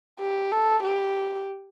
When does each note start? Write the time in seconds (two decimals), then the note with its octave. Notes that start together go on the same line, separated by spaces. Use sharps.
0.19 G4
0.52 A4
0.83 G4